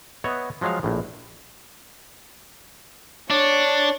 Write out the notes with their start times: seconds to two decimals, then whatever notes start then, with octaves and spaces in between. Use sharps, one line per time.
0.24 B3 C#5 D#5 E5 F#5
0.61 F3 F#3 G#3 C#5 F5
0.83 A#1 A2
3.30 D4 C#5